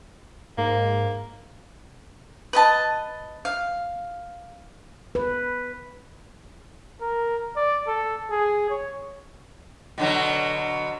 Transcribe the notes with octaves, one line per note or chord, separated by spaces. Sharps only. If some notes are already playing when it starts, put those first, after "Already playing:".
G#2 A#3
B4 D#5 A5
F5
B4
A#4
D5
A4
G#4
C#5
B2 D3 F#3